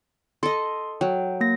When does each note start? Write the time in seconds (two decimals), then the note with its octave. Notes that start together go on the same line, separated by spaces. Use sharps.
0.43 A4 D#5 C6
1.01 F#3 G5
1.41 A#3 A#6